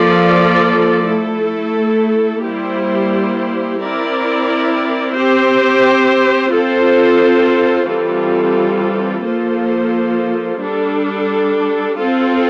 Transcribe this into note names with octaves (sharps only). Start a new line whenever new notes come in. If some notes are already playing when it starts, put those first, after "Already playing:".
Already playing: F3 A#3 F4 A4 D5
A3 E4 A4
G3 A#3 E4 G4 C5
C4 E4 A#4 D5
C4 G4 C5
C4 F4 A4 C5
E3 G3 C4 F4 A4
F3 A#3 F4 A4 C5
G3 D4 A4
C4 F4 A4